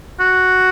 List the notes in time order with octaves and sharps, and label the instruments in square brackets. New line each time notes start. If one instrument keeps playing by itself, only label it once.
[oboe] F#4